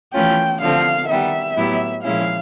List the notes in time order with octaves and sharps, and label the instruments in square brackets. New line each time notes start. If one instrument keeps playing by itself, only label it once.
[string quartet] E3 A3 C#4 F4 [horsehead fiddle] G5
[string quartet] D3 F3 A3 C4 [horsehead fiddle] F5
[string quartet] D#3 G3 B3 [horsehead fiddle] E5
[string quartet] A2 F#3 B3 E4 G4
[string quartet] A#2 F3 G#3 C#4 E4 [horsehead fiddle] F5